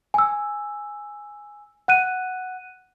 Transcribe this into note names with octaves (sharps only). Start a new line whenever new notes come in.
G#5 E6
F#5 F#6 D#7